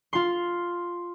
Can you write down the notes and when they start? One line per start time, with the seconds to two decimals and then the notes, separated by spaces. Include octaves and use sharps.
0.13 F4 C6